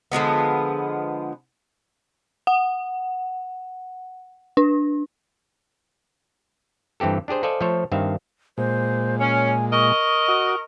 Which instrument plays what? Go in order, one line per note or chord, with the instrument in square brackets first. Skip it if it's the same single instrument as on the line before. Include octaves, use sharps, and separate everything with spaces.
[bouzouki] D3 F3 G#3 B3
[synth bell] F#5
D4
[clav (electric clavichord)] G2 E3 C4 G4 A4
D4 G4 G#4 C5
A4 C5 D5 D#5 F5 G#5
F3 A3 A4 C5 C#5
G2 D#3 C4 E5 F5
[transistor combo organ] A#2 G#3 [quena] C5
[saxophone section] C#4 [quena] G#5
[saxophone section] A#4 D#5 [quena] C#6
[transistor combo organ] F#4